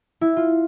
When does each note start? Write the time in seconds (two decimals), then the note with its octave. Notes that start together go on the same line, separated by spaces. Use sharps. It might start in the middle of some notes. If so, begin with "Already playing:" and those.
0.21 E4
0.37 F4